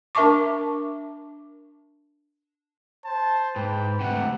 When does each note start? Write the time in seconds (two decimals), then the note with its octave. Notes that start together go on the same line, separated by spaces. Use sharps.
0.15 D4 A#4 E5 A5 C#6 D6
3.05 C5 A5
3.56 G#2 B4 G5
4.00 D2 C3 F#5